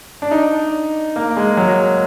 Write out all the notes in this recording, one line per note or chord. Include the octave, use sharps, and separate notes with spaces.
D4
D#4
A#3
G#3
F#3